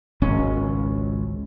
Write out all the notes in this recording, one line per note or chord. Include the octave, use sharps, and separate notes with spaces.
G#1 C#2 C#4